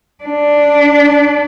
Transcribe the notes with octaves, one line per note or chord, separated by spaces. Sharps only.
D4